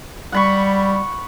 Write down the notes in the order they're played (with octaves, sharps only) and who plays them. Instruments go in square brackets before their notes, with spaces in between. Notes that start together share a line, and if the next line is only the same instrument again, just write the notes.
[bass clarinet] G3 [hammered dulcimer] F#5 B5 C#6